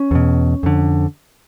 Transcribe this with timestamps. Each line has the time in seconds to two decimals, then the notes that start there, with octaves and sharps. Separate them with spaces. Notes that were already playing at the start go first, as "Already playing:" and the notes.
Already playing: C#4
0.11 E2 B2
0.63 F2 D3